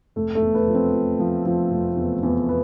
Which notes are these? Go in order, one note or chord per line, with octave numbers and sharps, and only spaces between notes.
F1 A3
A3
E2
B3
F3
C4
F3
F3
F3
F1
E2
E2
B3